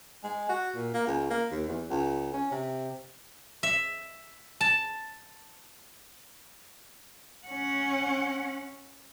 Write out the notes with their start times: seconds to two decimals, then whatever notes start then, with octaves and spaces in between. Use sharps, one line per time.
0.23 G#3
0.49 F#4
0.75 A#2
0.94 A#3
1.07 C#2
1.30 A#3
1.51 D#2
1.68 E2
1.90 C#2
2.33 C#4
2.51 C3
3.63 E5
4.61 A5
7.46 C#4 F#5